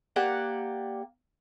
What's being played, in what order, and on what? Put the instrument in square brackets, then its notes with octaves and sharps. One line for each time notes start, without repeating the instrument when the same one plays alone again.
[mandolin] A#3 G4 D5 F#5